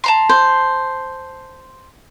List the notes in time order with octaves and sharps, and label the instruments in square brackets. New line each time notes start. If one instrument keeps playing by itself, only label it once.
[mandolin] A5 A#5 C6
[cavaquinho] C5